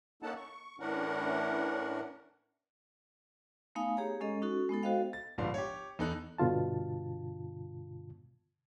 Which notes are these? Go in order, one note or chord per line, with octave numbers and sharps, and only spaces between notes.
A#3 C#4 D#4 A4 F#5 A5
C#6
A2 E3 C#4 D4 A#4 F#5
A3 B3 D#4 F5 G#5 D#6
G4 G#4 C#5 A#5
G#3 C#4 A4 D#5
C#4 D#4 F#4 A4
G#3 B3 D#4 A4
F#4 A4 C5 D#5 F5 G5
A6
G1 G#2 F3 D5 F5 C6
G4 C#5
E2 D#4 A4 F#6
G2 B2 D3 F4 A5